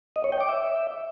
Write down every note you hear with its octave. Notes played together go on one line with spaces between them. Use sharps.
D#5
C#5
G5
D6
E5